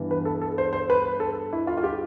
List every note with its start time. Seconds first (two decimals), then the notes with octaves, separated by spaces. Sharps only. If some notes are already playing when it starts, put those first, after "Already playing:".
Already playing: G2 E3 B3
0.11 B4
0.25 A4
0.42 A4
0.58 C5
0.73 C5
0.90 B4
1.20 A4
1.53 E4
1.67 F4
1.77 F4
1.84 G4